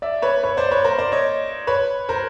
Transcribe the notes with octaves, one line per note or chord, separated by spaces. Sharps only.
D5 E5
B4 C#5
B4 C#5
C5 D5
B4 C#5
A#4 C5
C5 D5
C#5 D#5
B4 C#5
A#4 C5